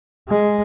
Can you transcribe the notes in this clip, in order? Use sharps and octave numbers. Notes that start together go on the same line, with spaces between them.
G#3